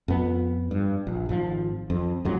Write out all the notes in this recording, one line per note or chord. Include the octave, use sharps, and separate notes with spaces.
F2 B3
G2
A#1
G#1 F3
F2
C#2 G#2 F#3